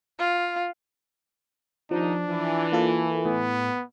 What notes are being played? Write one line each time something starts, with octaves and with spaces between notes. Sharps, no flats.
F4
D#2 F3 D4 D#4
E3
A#3 F4 A4
A2 B3